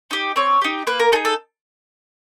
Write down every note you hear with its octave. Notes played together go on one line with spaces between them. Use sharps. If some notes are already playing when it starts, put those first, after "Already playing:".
D#4 G4
C4 C#5
D#4 G4
A#3 B4
A#4
D#4 G#4 A4
A4